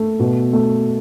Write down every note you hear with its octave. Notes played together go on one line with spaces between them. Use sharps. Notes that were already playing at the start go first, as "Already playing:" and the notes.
Already playing: A3
B2
A3